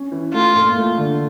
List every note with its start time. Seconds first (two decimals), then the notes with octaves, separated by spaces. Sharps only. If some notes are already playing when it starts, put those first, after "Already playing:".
Already playing: C#4
0.12 E3
0.33 A3 F4
0.55 A#2
0.77 A3
0.97 D3